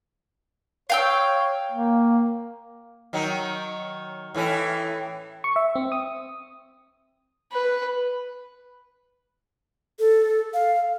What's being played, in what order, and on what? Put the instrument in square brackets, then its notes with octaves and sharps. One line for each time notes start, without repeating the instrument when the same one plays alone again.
[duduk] C#5 [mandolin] F5 G5 E6
[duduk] A#3
[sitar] D#3 F#3
A2 E3 C#4
[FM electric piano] C#6
E5
C4
D#6
[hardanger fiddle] B4
[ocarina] A4
F5